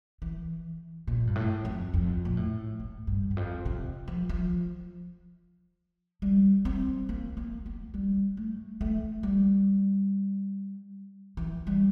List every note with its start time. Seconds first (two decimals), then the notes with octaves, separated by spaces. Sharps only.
0.22 E3
1.07 A#2
1.27 G2
1.35 A2
1.65 F2
1.94 F2
2.25 A#2
2.37 A2
2.80 A2
3.07 G2
3.31 E2
3.37 F2
3.65 C3
4.08 F3
4.29 F3
6.22 G3
6.65 C4
7.09 A#3
7.37 A#3
7.66 A#3
7.94 G3
8.37 A3
8.81 A3
9.23 G3
11.37 E3
11.67 G3